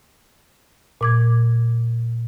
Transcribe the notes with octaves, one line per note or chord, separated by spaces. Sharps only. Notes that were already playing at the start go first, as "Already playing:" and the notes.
A#2 D6 G#6